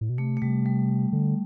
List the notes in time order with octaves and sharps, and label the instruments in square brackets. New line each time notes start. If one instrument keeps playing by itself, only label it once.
[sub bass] A2
B2
[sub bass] C3 [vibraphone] A3
[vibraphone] A3
[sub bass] C3 [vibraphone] G3
[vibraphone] G3
[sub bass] D3